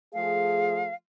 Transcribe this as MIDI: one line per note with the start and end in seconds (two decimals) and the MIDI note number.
0.14 0.89 53
0.14 0.89 57
0.14 0.89 68
0.14 0.94 77